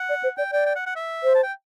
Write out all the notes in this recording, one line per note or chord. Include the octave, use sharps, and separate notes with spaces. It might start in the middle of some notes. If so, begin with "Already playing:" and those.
Already playing: F#5
D5
C5
D5 G5
D5 G5
G5
F#5
F#5
E5
C5
A5
G5